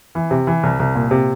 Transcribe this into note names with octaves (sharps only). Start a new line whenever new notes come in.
E3
C3
E3
C2
C2
A#2
C3